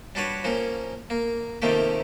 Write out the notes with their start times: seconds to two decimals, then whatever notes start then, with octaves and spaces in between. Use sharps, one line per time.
0.15 G3 D4 F#4 B4 C#5
0.44 F3 A#3 C#4
1.10 A#3
1.62 C3 D#3 F3 A3 A#3 G4